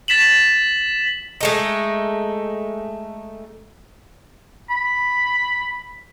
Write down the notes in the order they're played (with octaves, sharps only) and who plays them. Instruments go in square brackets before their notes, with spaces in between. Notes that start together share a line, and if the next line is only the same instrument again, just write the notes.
[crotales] A6 B6 E7 F#7
[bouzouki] G#3 A3 D#4
[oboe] B5